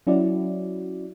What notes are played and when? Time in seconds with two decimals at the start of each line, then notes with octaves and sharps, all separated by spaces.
0.07 F#3 C#4 E4 F#4 D5